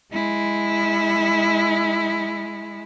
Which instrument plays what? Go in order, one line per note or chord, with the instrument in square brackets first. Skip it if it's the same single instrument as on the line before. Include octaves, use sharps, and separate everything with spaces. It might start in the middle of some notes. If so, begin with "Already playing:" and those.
[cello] G#3 E4